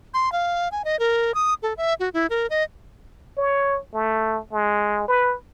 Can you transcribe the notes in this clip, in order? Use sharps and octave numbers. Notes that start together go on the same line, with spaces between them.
C6
F5
G#5
D#5
A#4
D#6
A4
E5
F#4
E4
A#4
D#5
C#5
A3
G#3
B4